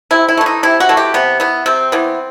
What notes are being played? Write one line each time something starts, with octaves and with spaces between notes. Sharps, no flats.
C3 E4
E4
E3 A3
D#4
C3 E4
F#4
E3 A3
G4
C3 B3
E3 B3
C3 C4
E3 B3